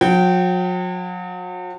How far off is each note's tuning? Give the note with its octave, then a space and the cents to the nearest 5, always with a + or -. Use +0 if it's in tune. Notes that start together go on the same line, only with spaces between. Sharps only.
F#3 -40 G5 -20